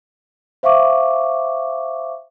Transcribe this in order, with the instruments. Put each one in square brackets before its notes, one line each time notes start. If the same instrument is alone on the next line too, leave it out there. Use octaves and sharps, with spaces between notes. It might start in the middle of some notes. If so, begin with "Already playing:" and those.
[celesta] C5 E5 F5 C#6 D6